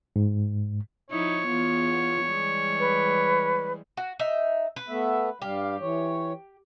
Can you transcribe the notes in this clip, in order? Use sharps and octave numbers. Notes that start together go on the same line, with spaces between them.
G#2
F3 D#4 E4 C#5
E2 B3 F4
E3 G3 G#3
B4
F#4
D#4 E5
B4
A3 B3 E5
G2 G3 G4 F5
E3 C#5